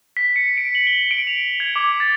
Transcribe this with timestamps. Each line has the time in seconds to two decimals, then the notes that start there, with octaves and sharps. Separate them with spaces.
0.17 B6
0.36 C#7
0.57 D7
0.75 F#7
0.87 G7
1.11 D7
1.27 F7
1.60 G#6
1.76 D6
2.00 A6